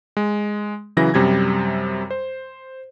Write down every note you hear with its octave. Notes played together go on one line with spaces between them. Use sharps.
G#3
C#3 E3 F#3 E4 A#6
F#2 C3 G3 G#6
C5